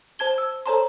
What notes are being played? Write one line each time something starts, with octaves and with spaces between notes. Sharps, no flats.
C5 A5 G#6 G7
E6
A4 C5 C#5 A5 A#5 C6